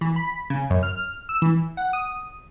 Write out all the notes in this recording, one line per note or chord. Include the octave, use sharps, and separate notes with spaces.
E3
B5
C#3
F#2
F6
E6
E3
F#5
D#6